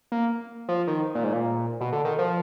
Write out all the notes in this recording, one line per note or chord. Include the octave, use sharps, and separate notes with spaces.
A#3
F3
D#3
A#2
G#2
A#2
B2
D3
D#3
F3